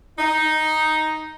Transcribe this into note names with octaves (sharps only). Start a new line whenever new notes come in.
D#4